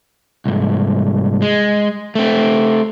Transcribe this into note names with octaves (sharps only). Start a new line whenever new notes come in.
C2 G#2
G#3
A3 C4